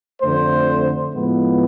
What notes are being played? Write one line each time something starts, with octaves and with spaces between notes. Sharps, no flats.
F2 D3 A3 C5
A2 F3 G#3 B3